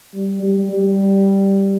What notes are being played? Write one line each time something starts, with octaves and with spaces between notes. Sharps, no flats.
G3
G3
G3